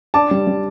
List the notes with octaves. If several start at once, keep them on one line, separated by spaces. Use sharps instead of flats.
D4 A5 D6
G3
G3